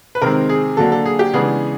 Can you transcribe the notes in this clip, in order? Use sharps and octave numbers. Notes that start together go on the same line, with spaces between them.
B4
C3 D#3 G#3 C4 A#4
G#4
D3 F#3 A#3 D4 A4
A4
G#4
G4
C#3 E3 G#3 B3 D4 G#4